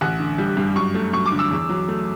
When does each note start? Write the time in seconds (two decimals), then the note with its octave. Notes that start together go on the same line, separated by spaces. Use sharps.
0.01 A1 F#5
0.20 D3
0.38 G3
0.57 G2
0.76 F#2 C#6
0.95 A3
1.13 F#2 C#6
1.26 D6
1.32 D3
1.39 E6
1.51 E2
1.69 F#3
1.88 A3